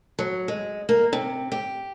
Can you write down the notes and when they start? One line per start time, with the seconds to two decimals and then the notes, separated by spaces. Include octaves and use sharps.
0.19 F#3
0.48 G#3
0.89 A#3
1.13 C3
1.52 G4